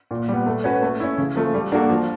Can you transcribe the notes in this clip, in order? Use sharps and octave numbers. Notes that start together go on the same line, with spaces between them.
A#2
G3 B3
A3
C#4 F#4 B4
A3
C#4 E4
C#3
F3 A3
G3
A#3 D4 F#4 A4
F3